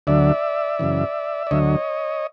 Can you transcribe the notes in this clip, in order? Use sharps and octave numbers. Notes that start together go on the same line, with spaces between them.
D2 D3 F#3 D5 E5
F#2 C#3 E3
D5
D2 D3 F#3 C#5 D#5